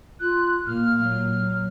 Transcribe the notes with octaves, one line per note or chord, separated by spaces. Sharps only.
F4 F#6
A#2 A#3 F6
F#3